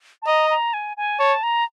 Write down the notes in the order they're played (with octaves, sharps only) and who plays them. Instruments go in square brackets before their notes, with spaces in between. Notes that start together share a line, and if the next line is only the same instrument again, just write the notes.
[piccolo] A5
[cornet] D#5 [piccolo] A#5
[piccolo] A#5
G#5
G#5
[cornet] C#5 [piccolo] A5
[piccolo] A#5